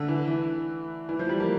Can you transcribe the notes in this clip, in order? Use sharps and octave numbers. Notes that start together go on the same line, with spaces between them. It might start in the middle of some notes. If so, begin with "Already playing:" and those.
Already playing: D3 A3
E3
E3
E3
F3
G3
A#3